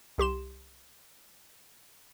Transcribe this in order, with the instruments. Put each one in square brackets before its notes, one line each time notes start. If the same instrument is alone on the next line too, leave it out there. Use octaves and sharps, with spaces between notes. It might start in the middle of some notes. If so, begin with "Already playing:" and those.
[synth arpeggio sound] C2 G4 C6 E7